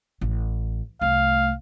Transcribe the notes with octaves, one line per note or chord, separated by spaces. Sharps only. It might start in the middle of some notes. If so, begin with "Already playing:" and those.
A1
C2 A3 F5